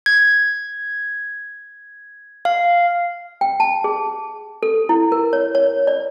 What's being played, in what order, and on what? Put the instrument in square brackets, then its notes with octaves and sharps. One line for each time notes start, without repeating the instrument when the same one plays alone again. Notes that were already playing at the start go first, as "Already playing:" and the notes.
[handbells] G#6
F5
[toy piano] G5
A5
G#4
A4
E4
A#4
C#5
C#5
D5